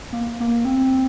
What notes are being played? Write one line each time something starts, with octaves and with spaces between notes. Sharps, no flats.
A#3
A#3
C4